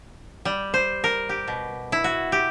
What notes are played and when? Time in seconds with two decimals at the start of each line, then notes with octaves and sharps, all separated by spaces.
0.45 G3
0.74 C5
1.04 A#4
1.29 G4
1.48 B2
1.92 E4
2.04 F#4
2.32 G4